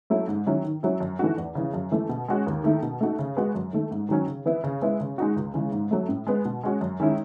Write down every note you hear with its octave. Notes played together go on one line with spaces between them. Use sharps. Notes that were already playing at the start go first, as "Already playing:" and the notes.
F#3 A3 E4
G#2
D#3 F#3 C#4 E4
D#3
F#3 C#4 E4
F#2
E3 A3 D#4 F#4
E2
C#3 E3
F#2
E3 A3
B2
G#3 C#4 F#4
D#2
D#3 A3 E4
B2
A3 D#4 F#4
C#3
G#3 B3 F#4
F#2
D#3 A3
G#2
D#3 F#3 C#4
C#3
E3 B3 E4
C#3
G#3 B3 E4
C#3
G#3 D#4 F#4
C#2
C#3 E3 G#3
G#2
F#3 A3
A2
G#3 B3
B2
G#3 C#4 F#4
F#2
D#3 G#3 C#4 E4